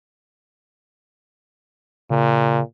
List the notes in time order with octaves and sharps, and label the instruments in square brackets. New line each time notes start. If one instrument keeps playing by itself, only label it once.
[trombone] A#2 [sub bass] C#3